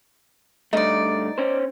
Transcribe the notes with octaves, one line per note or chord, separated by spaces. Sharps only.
G2 A3 D#4 D5
C#4 C5